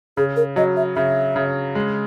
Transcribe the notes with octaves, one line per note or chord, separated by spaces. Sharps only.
C#3 G#4
A#4
F#3 D#5
E5
C#3 E5
C#3
G#3